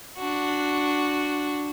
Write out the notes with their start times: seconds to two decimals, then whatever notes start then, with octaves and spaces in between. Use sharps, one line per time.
0.19 D4 F#4